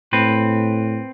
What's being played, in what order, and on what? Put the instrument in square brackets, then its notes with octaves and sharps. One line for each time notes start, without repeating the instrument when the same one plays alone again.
[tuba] A2 [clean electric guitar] C4 B4